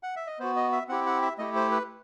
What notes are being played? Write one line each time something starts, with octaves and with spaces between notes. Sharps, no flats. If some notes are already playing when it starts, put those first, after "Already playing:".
F#5
E5
D#5
B3 F#4 C5
D#5
E5
C4 E4 G4 F#5
F#5
E5
A3 E4 G4 D#5
C5
B4